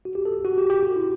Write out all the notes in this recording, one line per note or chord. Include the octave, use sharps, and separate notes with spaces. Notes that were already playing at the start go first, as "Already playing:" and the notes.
F#4
G4
A4
F#4
G4
G4
F#4
E4